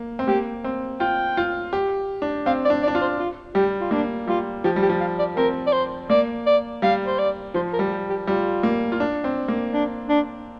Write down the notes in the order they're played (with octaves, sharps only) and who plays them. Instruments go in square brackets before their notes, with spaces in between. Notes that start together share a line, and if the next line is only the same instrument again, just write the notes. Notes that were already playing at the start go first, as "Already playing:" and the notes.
Already playing: [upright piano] A#3
C4
[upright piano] A#3 [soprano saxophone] G4
[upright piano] C4
[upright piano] F4 [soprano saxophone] G5
[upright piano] F4
G4
D4
[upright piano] C4 [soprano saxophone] F5
[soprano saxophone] D5
[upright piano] D4
[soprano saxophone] D5
[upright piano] D4
F4
[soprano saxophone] C5
F4
[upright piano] G3 [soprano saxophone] G4
[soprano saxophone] F4
[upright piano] A#3 [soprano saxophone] D4
[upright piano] G3 [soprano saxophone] F4
[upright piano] F3 [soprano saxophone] G4
[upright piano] G3
[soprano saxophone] G4
[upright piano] F3
[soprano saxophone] F5
D5
[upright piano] C4 [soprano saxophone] A#4
[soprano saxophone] D5
C5
[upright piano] A#3 [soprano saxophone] D5
[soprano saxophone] D5
[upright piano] G3 [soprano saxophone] F5
[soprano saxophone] C5
D5
[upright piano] F3 [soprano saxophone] C5
[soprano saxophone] A#4
[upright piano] G3
[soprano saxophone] G4
G4
[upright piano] G3 [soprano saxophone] F4
[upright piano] A#3
F4
D4
C4
A#3
[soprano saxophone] D4
D4